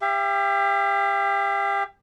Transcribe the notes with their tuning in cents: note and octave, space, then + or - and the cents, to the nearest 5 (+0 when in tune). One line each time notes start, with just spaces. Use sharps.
G4 +25 E5 +45